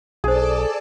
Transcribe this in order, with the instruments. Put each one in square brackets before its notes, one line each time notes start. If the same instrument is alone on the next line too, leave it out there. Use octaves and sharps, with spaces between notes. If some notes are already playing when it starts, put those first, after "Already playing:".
[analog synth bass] B1 [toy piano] D4 C5 [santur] G#4 [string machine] A4 D5 A5